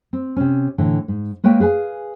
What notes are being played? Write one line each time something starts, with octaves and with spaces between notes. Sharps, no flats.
C4
C3 C#4
A2 D3 E3
G#2
G#3 A#3 B4 C#5 E5 G5
G#4 B4 F5 G#5